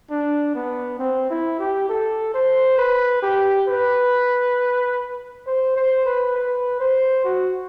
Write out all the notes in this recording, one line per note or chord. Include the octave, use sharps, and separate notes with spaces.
D4
B3
C4
E4
G4
A4
C5
B4
G4
B4
C5
C5
B4
B4
C5
F#4